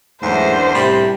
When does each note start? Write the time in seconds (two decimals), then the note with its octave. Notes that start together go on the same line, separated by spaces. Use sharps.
0.23 E2 G#2 F#3 A3 C#4 D4 A#4 C5
0.75 A2 C3 G3